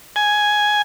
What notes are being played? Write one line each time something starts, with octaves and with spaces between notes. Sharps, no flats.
G#5